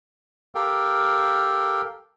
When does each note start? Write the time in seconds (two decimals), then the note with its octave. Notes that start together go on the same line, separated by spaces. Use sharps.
0.55 G4 A4 A#4 F5 G5